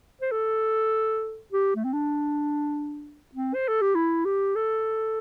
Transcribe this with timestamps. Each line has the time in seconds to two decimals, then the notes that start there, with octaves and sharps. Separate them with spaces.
0.21 C5
0.31 A4
1.52 G4
1.75 A3
1.84 C4
1.93 D4
3.35 C4
3.54 C5
3.68 A4
3.81 G4
3.95 E4
4.25 G4
4.56 A4